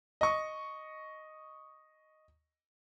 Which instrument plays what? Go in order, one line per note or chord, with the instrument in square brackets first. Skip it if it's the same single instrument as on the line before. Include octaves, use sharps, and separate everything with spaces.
[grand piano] D#5 C#6